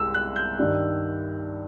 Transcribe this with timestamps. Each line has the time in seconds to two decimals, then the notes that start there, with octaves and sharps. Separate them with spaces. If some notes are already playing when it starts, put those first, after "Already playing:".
Already playing: C2 G#3 E6
0.14 F#6
0.36 G6
0.58 G2 D#3 G3